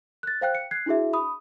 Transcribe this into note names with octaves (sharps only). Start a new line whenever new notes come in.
F#6 A6
C5 F5 G5 F#6
C#7
F#6 G#6 C7
D4 E4 F#4 G#4 E5
B5 D#6